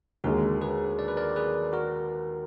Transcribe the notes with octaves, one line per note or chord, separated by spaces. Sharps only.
D#2 D3 G#3 F#4 A#4
G#4 B4
D5
B4
A#4 D5
G#4 B4
F#4 A#4